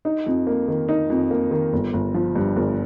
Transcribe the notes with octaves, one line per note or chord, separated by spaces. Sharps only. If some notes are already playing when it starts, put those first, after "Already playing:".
D#4
F2
A#3
D#3
D#4
F2
A#3
D#3
G1
G1
F3
G2
G1